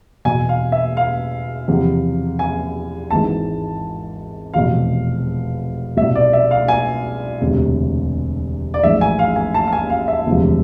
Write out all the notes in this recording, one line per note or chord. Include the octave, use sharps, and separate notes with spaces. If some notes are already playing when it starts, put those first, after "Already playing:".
E2 B2 G#5
F5
E5
F5
E2 C3 F3
G#5
G#1 G#2 E3 A5
F1 E2 B2 F5
C2 B2 E5
D5
E5
F5
G#5
E1 D2 C3
D5
A1 G#2 F3 E5
G#5
F5
G#5
A5
A5
G#5
F5
E5
E1 D2 C3 F3